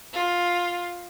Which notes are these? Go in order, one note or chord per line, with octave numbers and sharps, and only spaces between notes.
F4